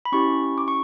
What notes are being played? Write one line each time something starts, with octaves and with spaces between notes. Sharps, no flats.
B5
C#4 E4 G4 C#6
D6
C#6